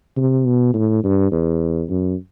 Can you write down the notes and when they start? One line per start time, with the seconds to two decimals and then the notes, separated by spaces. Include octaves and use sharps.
0.17 C3
0.46 B2
0.74 A2
1.04 G2
1.32 E2
1.90 F#2